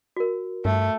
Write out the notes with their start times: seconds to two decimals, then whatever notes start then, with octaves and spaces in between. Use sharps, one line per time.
0.16 F#4 A#4
0.65 G2 A3